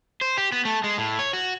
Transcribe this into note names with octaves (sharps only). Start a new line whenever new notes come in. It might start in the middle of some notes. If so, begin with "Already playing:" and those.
C5
G4
B3
A3
G#3
A2
C#5
F#4